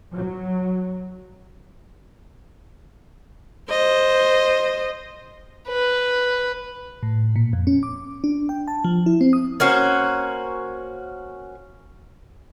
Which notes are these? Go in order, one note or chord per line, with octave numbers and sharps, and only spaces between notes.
F#3
C5 D#5
B4
A2
A#2
F2
C#4
D6
D4
G5
A5
F3
E4
C4
D#6
A#3 C#4 F#4 C5